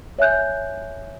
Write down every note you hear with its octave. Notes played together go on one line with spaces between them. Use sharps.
C#5 E5 G#5 F#6 G6